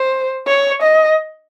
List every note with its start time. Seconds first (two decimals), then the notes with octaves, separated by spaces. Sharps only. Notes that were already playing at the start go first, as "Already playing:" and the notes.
Already playing: C5
0.47 C#5
0.82 D#5